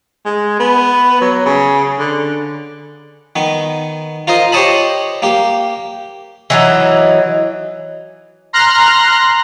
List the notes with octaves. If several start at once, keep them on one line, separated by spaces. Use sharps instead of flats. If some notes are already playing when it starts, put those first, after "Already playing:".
G#3
B3
F#3
C#3
D3
D#3 B3
F4 A#4 C5 D#5
G4 C5 C#5 D#5 A5 B5
A#3 G4
E3 F#3 D#4
A#5 C6 F6 F#6 A#6